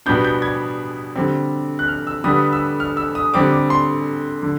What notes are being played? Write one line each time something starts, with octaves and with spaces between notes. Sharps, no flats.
B2 G3 B3 D4 G6
G6
G#6
D3 G3 C4
F#6
F6
E6
D3 G3 B3 D#6
E6
F6
E6
D#6
D3 G3 C4 D6
D6
C6
D3